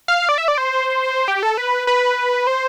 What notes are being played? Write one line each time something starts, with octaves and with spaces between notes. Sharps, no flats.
F5
D5
E5
D5
C5
G4
A4
B4
B4
C5